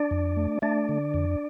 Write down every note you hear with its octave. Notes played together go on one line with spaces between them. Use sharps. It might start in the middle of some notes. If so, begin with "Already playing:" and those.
Already playing: D4 D5
F2
A3
A3 D4 D5
D3
F2